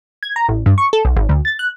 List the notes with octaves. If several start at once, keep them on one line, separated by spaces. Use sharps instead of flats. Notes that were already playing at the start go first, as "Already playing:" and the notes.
G#6
A#5
A1
G2
C#6
A4
B1
G#1
D2
A6
F#6